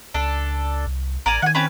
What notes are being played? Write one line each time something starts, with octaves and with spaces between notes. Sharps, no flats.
C#2 D4 A4
C2
A1 A#4 D5 G#5
D#3 F#5 G#5
C4 C#4 B4